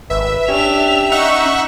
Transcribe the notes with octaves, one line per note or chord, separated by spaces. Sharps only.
G#1 B4 E5
C#4 D4 G4 F7
D#4 E5 F#5 C#6